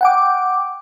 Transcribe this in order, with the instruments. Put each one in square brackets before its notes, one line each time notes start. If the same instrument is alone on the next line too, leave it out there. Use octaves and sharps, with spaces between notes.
[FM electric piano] F#5 G5 D6